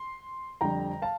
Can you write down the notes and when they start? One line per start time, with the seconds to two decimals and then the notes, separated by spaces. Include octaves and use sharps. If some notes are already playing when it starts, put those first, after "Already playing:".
Already playing: C6
0.61 F2 D3 G3 G5 A#5
1.02 F5 A5